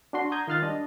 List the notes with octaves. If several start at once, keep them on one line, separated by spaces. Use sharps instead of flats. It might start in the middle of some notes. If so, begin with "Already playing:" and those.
D4 F#4 C6
A#5 D#6 G6 G#6
D#3 F4 C6 F6 F#6 A6
G3 D4 D#5